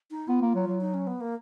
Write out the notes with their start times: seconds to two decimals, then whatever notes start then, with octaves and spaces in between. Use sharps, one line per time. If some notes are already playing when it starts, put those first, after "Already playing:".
0.11 D#4
0.28 B3 F4
0.42 A#3
0.55 F#3
0.67 F#3
0.81 D#4
0.94 C#4
1.07 B3
1.21 A#3